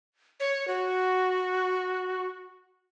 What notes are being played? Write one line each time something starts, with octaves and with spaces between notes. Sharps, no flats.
C#5
F#4